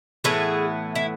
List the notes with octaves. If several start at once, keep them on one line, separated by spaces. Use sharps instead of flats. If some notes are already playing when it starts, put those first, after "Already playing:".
A2 E3 B3 E4 G#4
E4